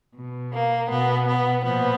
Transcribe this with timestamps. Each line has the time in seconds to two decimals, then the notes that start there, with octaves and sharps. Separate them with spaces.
0.16 B2
0.53 A#3
0.90 B2 B3
1.27 B3
1.64 A#2 F3 B3